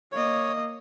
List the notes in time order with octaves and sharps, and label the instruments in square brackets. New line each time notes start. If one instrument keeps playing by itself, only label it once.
[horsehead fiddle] A#3 D#5 [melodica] C#5